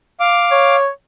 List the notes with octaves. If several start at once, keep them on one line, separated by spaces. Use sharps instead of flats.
F5 D6
C#5